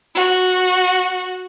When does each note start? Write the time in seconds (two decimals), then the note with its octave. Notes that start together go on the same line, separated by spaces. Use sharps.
0.15 F#4